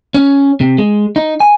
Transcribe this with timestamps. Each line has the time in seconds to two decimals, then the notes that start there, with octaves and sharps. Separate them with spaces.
0.14 C#4
0.60 C3
0.78 G#3
1.16 D#4
1.40 G#5